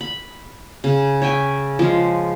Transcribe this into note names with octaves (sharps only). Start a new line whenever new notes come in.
B5
C#3
C#5 E5 G5 G#5
F3 G#3